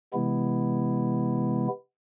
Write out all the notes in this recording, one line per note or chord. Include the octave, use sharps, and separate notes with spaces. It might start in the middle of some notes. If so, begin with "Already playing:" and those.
C3 E3 G#3 B3 E4